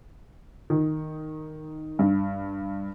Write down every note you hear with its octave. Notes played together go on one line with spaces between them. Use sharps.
D#3
G2